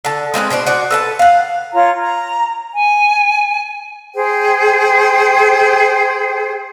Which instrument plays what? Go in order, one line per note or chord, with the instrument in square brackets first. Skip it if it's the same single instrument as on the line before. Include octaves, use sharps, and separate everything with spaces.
[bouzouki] D3 A5
G#3 C4 C#4 B4
B2 D4 C5 D5
F#4 C5 D5
A4 B4 A5
F5 F#5
[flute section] F4 C#5 A#5
A#5
G#5
G#4 C5 G5